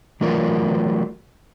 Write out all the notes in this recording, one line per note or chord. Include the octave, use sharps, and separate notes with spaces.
E3 F#3 A3 F4 A#4 D5